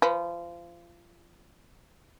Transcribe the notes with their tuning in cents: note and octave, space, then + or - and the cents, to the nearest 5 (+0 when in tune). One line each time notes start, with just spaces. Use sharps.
F3 -25 B4 +0